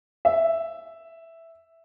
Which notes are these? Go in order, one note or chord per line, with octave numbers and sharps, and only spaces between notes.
E5